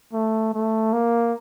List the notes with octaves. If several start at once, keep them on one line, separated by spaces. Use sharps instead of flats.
A3
A3
A#3